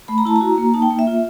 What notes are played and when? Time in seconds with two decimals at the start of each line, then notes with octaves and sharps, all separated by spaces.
0.08 A3 B5
0.18 A#5
0.25 E4 A5
0.36 A#5
0.41 F#4
0.58 A#3
0.74 D#4 A5
0.82 G5
0.90 A#3
0.99 E5
1.07 F4